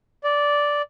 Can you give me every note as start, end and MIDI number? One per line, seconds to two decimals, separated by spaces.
0.24 0.82 74